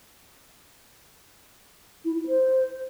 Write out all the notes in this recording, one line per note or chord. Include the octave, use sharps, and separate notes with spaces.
E4
E4
C5